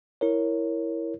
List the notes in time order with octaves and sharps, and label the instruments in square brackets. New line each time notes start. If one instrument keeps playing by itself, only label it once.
[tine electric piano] E4 A#4 C#5